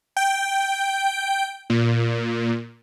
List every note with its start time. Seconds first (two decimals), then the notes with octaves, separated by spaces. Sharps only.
0.17 G5
1.70 A#2